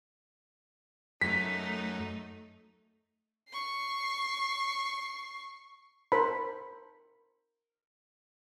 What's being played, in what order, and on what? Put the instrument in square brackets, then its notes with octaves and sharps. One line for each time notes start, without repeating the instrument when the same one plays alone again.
[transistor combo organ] F#2 [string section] A3 D#4 [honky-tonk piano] B6
[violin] C#6 C7
[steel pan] A#4 C5 A5 B5